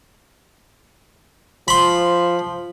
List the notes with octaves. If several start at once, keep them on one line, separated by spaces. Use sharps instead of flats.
F3 B5 C6